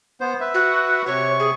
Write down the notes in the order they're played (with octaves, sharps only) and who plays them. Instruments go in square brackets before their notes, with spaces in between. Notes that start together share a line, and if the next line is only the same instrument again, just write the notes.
[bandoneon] B3 C5
B4 E5
[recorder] F#4
[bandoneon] C3 C#6 [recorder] C#5
[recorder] G#4